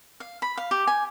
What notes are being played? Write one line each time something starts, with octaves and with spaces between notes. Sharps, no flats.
F5
B5
F5
G4
G#5